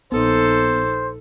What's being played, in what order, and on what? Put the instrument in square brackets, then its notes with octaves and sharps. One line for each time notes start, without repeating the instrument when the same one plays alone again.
[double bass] A#1 D#4 [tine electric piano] B3 [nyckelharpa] A4 [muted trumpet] C5